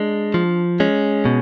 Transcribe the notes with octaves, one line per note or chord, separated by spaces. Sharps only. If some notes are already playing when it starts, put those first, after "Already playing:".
Already playing: G#3 D4
F3
G#3 C#4
B2